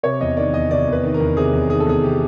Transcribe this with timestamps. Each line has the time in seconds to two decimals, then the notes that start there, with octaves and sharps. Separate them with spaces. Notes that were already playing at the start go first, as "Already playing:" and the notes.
0.03 C3 C#5
0.21 E2 D#5
0.37 D#3 D5
0.53 E2 D#5
0.70 C3 D5
0.87 E2
0.92 B4
1.04 D#3
1.14 A#4
1.20 E2
1.37 C3 G#4
1.53 E2
1.69 D#3 G#4
1.80 A4
1.87 E2 G#4
2.03 C3 G4